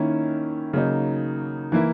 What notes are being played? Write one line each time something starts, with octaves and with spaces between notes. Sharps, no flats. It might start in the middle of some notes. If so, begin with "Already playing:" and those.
Already playing: D#3 A#3 C#4 E4
C#3 F#3 A#3 D#4
E3 A#3 E4